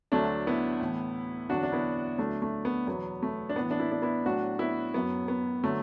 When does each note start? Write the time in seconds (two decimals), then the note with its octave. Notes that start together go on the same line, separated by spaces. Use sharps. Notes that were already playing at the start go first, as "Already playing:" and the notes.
0.12 D2 D3 F#3 A3 D4
0.47 B3 E4
0.80 A2 E3
1.49 E2 D3 F#3 D4 F#4
1.63 D4
1.72 B3 E4
2.18 D2 D3 F#3 A3 D4
2.42 A3
2.65 B3
2.87 E2 B2 F#3 B3
3.23 A3
3.49 D4
3.56 A2 E3 B3
3.71 D4
3.79 B3 E4
3.92 D4
4.02 B3 E4
4.25 A2 F#3 D4 F#4
4.59 B3 E4
4.94 F#2 F#3 B3
5.28 B3
5.64 D3 F#3 A3